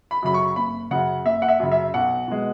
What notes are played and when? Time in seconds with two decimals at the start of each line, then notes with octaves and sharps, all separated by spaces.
0.11 B5
0.22 F#2 C#3 F#3 B5
0.34 C#6
0.56 F#1 B5
0.91 F#2 C#3 F#5
1.25 F#1 E5
1.42 F#5
1.48 E5
1.59 F#2 C#3
1.72 E5
1.94 B1 F#5
2.28 B2 G#3